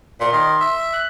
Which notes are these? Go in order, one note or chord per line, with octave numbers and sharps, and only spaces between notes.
A#2 C6
D#3
E5
F#6